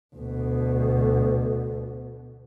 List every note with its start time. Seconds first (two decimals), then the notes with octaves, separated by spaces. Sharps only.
0.16 D2 B2